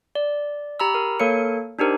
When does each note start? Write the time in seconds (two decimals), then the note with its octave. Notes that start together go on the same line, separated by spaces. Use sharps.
0.15 D5
0.80 G4 A#5 B5 E6
0.95 A#4
1.20 A#3 A4 A#4 C#5 C#7
1.79 D4 D#4 G4 A#4 C5